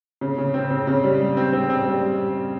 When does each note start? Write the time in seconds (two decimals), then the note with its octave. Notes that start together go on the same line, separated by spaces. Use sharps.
0.21 C#3
0.38 C#3
0.54 C4
0.71 C#3
0.87 C#3
1.04 G3
1.20 G3
1.37 C4
1.53 C4
1.70 C4
1.86 G3